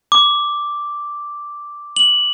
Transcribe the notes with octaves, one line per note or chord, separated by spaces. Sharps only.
D6
F#7